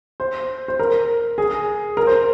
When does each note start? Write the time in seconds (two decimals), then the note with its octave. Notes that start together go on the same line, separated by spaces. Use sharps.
0.20 C5
0.68 C5
0.79 A#4
1.38 G#4
1.97 A#4
2.07 C5